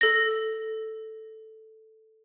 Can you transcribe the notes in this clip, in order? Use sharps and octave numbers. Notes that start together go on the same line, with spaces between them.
A4 A#6